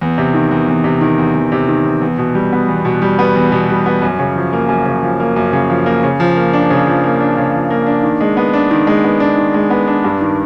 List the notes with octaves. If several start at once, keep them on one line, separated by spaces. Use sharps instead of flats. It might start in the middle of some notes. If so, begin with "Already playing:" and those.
E2
C3
D#3
E2
E2
C3
D#3
E2
E2
C3
D#3
E2
E2
B2
G3
B3
E2
B2
G3
B3
E2
B2
G3
B3
F#2
C#3
F3
A#3
F#2
C#3
F3
A#3
F#2
C#3
F3
A#3
C#3
F3
A#3
D4
C#3
F3
A#3
D4
C#3
F3
A#3
D4
D#3
G#3
B3
D4
D#3
G#3
B3
D4
D#3
G#3
B3
D4
G2
D#3